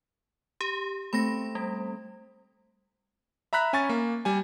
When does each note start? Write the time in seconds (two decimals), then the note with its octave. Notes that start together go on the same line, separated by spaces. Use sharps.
0.61 G4
1.13 A3 C4 B5 A#6
1.55 G3
3.53 E5 A#5 B5 F#6 B6
3.73 C#4 G#5 C#6 A6
3.89 A#3
4.25 G3 G#5